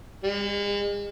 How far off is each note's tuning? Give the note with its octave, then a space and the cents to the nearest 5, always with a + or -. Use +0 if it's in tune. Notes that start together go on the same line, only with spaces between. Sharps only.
G#3 -40